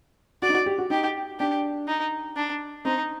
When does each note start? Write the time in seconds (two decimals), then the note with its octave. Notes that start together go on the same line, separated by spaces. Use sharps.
0.42 F#4 D5
0.49 D#4
0.54 F#4
0.66 G4
0.78 F#4
0.90 D#4 G4
1.39 D4 G4
1.88 D#4
2.37 D4
2.85 C4 D#4